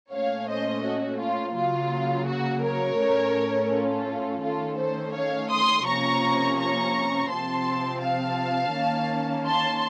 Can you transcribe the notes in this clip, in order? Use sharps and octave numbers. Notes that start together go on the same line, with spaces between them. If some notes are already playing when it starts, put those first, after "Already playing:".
A#2 A3 C#4 C#5 F5
C5 D#5
F#4
F4
C#3 F#3 A#3 F4
F#4
A#4 C#5
A2 A3 C#4
F4 A4
D#3 A3 C#4 F4 A4
A4 C5
C#5 F5
C6 D#6
C3 F3 A#3 C#4 A#5 C#6
A#5 C#6
C3 F3 C4 A5 C6
F5 A5
D#3 A#3 C#4
A5 C6